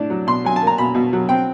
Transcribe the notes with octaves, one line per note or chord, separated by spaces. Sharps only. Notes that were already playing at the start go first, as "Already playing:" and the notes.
Already playing: A2 D4
F#3
B2 C6
F#3 G#5
A5
A#3
A#5
B2 B5
B2
F#3
C4 G5